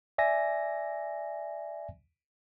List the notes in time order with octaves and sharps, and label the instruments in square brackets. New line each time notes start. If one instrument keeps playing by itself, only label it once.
[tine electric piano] D5 E5 G#5 A#6